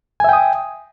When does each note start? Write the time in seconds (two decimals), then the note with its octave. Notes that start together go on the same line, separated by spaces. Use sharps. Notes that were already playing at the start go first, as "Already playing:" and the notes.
0.20 G#5
0.24 E5
0.29 G5
0.33 D#6